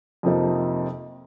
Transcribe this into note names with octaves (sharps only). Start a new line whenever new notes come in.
F2 C3 F3 A#3 D#4